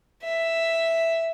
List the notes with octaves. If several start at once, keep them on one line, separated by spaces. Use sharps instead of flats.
E5